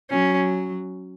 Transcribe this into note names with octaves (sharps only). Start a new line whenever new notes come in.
F#3 C#4